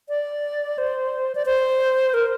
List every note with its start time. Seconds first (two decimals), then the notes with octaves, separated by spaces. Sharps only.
0.09 D5
0.78 C5
1.35 D5
1.46 C5
2.14 A#4